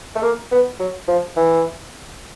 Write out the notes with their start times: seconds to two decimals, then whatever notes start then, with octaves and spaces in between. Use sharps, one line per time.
0.16 A3
0.22 A#3
0.51 B3
0.79 F#3
1.08 F3
1.36 E3